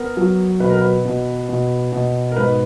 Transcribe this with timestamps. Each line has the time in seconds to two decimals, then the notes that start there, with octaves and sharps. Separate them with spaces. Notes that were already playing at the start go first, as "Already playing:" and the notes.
Already playing: B3 A#4
0.17 F#3
0.60 B2 B4
0.70 A#4
0.78 B4
1.05 B2
1.49 B2
1.92 B2
2.32 A#4
2.37 G#2 B4